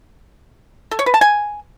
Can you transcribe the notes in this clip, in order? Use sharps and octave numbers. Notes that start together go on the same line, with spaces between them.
A4
C#5
B4
A5
G#5